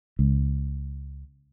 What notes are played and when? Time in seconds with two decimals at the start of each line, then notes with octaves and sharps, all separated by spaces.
0.19 C#2